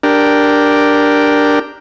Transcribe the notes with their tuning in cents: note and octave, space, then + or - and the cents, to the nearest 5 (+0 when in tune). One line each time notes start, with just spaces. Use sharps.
D4 +0 G4 +0 A#4 +0